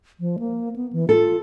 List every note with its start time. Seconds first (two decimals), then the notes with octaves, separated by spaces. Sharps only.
0.20 F3
0.39 A#3
0.76 B3
0.93 E3
1.09 F4 A4